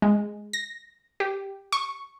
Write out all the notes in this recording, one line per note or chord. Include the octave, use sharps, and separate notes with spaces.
G#3
A#6
G4
C#6